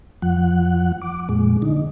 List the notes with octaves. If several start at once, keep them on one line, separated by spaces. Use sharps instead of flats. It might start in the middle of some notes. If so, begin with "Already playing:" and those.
F2 F3 F#5
D6
F2 A#2 G#3
D3 D#4